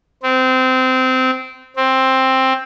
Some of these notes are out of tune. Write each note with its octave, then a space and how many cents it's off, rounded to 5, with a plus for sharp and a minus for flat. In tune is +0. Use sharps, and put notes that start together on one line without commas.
C4 -20
C4 +10